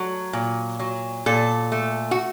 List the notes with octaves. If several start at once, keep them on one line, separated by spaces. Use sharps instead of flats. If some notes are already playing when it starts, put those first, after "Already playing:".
Already playing: F#3 A3
A#2
F#3
A#2 A4
A3
F#4